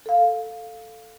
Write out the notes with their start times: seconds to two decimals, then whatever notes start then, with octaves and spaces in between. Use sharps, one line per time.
0.06 A4 F5